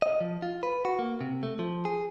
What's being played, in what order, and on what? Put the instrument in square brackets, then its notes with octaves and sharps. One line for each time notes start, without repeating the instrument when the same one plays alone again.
[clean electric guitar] D#5
F3
F4
B4
F#4
A#3
C3
A3
F3
G#4